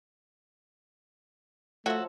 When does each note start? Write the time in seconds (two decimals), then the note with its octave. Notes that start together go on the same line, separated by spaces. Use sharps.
1.86 F3 A3 F#4 A4 C#5 E5 A#5